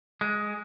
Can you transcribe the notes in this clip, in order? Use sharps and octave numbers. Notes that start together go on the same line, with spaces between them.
G#3